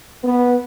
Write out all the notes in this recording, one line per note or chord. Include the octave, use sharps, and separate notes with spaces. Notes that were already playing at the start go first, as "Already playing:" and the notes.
B3